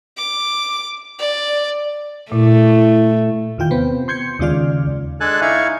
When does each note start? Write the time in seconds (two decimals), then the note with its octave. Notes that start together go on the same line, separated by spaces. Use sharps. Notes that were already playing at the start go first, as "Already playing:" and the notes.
0.17 D6
1.19 D5
2.32 A#2 A3 E4
3.58 E2 D#3 F4 G5 G6
3.71 C3 B3 C4
4.08 C6 G6 G#6 C#7
4.39 D#2 C#3 G#3 F4 D5 F6
5.20 G#3 D4 A4 G#5 A5 F#6
5.41 D#4 E4 E5 F5 G#5 C#6